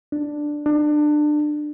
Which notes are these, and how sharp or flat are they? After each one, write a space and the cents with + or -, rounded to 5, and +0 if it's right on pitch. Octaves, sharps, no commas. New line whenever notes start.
D4 +5
D4 +25